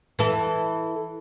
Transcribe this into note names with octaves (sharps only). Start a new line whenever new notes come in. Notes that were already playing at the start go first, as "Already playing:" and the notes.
E3 A4